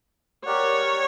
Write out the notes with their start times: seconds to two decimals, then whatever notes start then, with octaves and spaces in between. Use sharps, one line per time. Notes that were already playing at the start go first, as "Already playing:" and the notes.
0.46 G4 A#4 C#5 D5 F#5